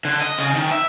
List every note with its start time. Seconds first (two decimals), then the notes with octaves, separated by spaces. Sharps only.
0.05 D3
0.21 D#5
0.38 C#3
0.55 D#3
0.71 E5